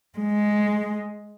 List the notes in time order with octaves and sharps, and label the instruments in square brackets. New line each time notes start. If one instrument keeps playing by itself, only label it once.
[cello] G#3